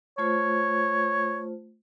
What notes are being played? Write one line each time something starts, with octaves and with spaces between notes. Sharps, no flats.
A3 F4 C5 C#5